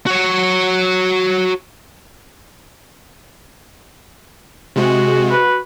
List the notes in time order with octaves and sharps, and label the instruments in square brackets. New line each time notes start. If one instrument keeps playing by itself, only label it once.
[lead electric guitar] F#4 C#5
[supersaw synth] C3 G#3 [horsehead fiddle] F#4
[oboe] B4